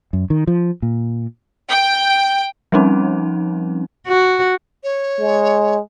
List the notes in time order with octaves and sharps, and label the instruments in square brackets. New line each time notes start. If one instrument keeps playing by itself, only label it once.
[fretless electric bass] F#2
D#3
F3
A#2
[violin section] G5
[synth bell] F3 G3 C4 C#4 D#4
[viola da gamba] F#4
[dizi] C#5
[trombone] G#3